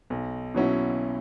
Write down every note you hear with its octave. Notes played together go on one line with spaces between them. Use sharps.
B1
B2 F#3 C#4 E4